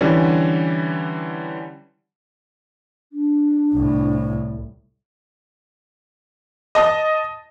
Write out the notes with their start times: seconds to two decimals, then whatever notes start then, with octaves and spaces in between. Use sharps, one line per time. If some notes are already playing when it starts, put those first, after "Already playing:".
0.01 D3 E3 G3 C#4
3.13 D4
3.73 C2 A2
6.75 D#5 A5 D#6